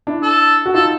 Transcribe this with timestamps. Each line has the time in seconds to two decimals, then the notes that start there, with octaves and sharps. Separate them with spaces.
0.07 D4 E4
0.23 A4
0.66 F#4
0.74 D#4 F4 A4